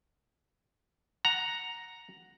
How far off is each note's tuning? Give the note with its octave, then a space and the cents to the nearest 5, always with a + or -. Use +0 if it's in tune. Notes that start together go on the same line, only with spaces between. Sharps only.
F#5 +0 A#5 +0